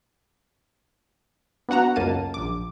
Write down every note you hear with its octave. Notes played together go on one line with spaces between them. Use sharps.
B3 D4 F#4 F#5 A#5
C#2 F#2 A#3 A5 D#7
A#1 D6